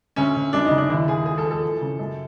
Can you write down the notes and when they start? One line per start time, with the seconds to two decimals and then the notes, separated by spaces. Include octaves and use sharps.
0.16 D2 C#4
0.36 D2
0.53 F#2 D4
0.65 D#4
0.71 C#3
0.78 D4
0.89 D#2 E4
1.08 D#2 G#4
1.26 F3 G#4
1.38 A4
1.44 F3
1.51 A4
1.63 E3
1.81 C#3
1.99 F#2